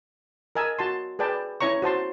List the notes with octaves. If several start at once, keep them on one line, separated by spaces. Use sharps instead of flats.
A#4 D#5 G#5 A5 E6
F#4 A5 C6
G#4 B4 D5 G5 A5
C#4 E4 C#5 A#5 C#6
F#4 C5 A5 C6